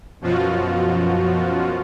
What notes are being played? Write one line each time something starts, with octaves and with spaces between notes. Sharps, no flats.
F#2 B2 F3 F4 F#4